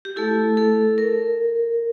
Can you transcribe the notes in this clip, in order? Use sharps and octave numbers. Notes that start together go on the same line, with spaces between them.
G4
A3 E4 A4
A4
A#4